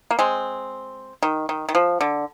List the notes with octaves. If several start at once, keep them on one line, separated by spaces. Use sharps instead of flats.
A#3
G#3 C4
D#3
D#3
D#3
F3
D3